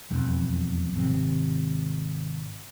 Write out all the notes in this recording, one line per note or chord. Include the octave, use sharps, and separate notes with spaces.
E1 B1 F2
G#1 C3